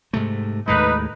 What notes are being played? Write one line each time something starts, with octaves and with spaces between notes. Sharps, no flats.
G#2 C3 A3
D#2 A2 G#3 D#4 B4